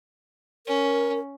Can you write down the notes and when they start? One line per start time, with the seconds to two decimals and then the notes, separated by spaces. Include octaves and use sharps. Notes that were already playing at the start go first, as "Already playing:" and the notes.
0.67 C#4 A#4